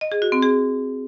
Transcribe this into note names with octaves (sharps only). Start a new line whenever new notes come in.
D#5
G#4
F#4
C4
G#4